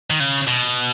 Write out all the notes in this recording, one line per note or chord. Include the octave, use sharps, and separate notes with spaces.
D#3
C#3
B2